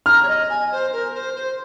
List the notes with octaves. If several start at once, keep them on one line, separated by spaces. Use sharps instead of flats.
A#5 F6
C#5
D#5
G#5
C5
A#4
C5
C5